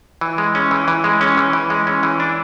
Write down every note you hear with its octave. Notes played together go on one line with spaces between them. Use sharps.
E3
G#3
C#4
E3
E3
G#3
C#4
E3
E3
G#3
C#4
E3
D4